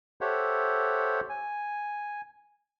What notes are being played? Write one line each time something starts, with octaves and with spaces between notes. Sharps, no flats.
G4 A4 C5 C#5 E5 F#5
G#5